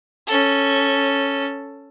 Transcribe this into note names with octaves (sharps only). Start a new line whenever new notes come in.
C#4 A4